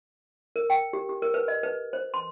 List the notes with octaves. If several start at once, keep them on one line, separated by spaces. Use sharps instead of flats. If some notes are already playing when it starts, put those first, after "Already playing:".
A#4
G5
G4
G4
A#4
B4
D#5
B4
C5
C6